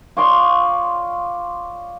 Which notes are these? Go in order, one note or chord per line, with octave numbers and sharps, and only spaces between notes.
F4 C#5 D5 C6